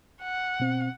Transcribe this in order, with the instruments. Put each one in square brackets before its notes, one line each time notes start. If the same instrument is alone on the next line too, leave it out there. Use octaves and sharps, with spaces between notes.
[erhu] F#5
[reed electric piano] B2 C4